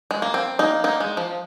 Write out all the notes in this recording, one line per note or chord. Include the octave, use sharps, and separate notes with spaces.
G#3
A#3
C4
A#3 D#4
A#3 D#4
G#3
F3